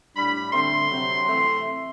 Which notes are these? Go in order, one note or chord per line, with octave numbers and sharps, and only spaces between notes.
A2 G3 D4 B5
D3 A3 C4 C6
C3 F#3 C4
E3 A3 C4